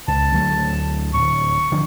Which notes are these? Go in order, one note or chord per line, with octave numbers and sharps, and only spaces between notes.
C#2 A5
D2 F#3 A3
D1 C#6
D3 F3